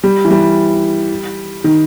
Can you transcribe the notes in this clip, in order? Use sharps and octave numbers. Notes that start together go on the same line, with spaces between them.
G3
E3
G3
D#3